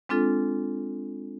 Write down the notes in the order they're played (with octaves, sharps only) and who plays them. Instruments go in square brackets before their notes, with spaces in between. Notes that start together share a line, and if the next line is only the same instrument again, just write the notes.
[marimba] G#3 C4 D4 F4 A4